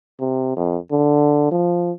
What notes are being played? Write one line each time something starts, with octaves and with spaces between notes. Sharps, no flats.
C3
F2
D3
F3